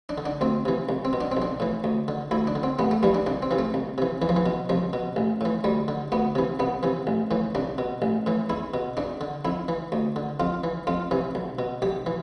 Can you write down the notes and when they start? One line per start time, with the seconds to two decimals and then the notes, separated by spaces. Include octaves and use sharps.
0.09 D4
0.18 D3
0.26 D4
0.41 D2 C4
0.65 C3 E3
0.89 C2
1.05 C4
1.13 B2
1.21 D4
1.32 C4
1.37 B1 D4
1.60 A2 E3
1.84 D2
2.08 D3
2.31 D2 E4
2.47 D4
2.55 D3
2.63 C4
2.79 A1 B3
2.91 A3
3.03 G2 E3 G3
3.14 D4
3.26 C2 D4
3.42 C4
3.51 C3 E3
3.59 A3
3.74 C2
3.98 C3 E3
4.22 E2 E3
4.29 F3
4.36 E3
4.46 B2
4.69 C2 F3
4.93 B2
5.16 A1
5.41 A2 E3
5.64 D2 G3
5.88 D3
6.12 D2 B3
6.35 C3 E3
6.59 C2 B3
6.83 C3 E3
7.07 A1
7.31 A2 E3
7.55 C2 D4
7.78 B2
8.02 A1
8.26 A2 E3
8.50 E2 E4
8.74 B2
8.97 E2 D4
9.21 D3
9.45 F2 E4
9.68 E3
9.92 D2
10.16 D3
10.40 F2 F4
10.64 E3
10.87 F2 F4
11.11 C3 E3
11.35 B1
11.59 B2
11.82 B1 G4
12.06 E3